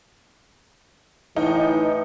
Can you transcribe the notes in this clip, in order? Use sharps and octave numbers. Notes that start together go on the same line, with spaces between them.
A2 E3 D#4